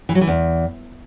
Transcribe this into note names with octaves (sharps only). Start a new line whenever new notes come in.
E3
F#3
E3
E2